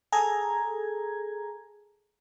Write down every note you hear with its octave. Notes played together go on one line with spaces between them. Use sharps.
G#4 A4 A#5 G#6